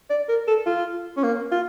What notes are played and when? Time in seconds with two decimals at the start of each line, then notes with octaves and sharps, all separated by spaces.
0.10 D5
0.29 A#4
0.48 A4
0.66 F4
1.17 C#4
1.23 A#3
1.52 F4